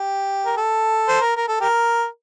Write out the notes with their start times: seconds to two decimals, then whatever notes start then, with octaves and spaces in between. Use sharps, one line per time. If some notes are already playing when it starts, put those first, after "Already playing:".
Already playing: G4
0.46 A#4
0.57 A4
1.08 C5
1.21 A#4
1.36 A#4
1.48 A4
1.61 G4 A#4